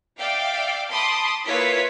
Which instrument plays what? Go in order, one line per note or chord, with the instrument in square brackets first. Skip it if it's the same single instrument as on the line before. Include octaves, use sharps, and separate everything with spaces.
[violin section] D5 E5 F5 G5 D6
A5 B5 C6 D6 D#6
A#3 E4 F4 B4 C#5 B6